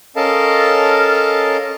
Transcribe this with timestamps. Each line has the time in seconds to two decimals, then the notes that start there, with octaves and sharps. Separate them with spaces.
0.16 C#4 A4 A#4 D#5 F5 A5